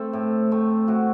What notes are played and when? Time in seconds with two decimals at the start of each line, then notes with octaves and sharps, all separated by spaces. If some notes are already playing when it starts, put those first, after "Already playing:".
Already playing: A3 C4 A4 C5
0.13 A2
0.51 A3 C4
0.88 A2 F#4